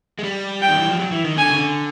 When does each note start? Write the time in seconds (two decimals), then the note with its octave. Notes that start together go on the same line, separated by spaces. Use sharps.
0.19 G#3
0.24 G3
0.62 G5
0.69 D#3
0.79 E3
0.90 F3
0.99 F#3
1.12 E3
1.25 D#3
1.37 D3 G#5
1.50 C#3
1.57 D3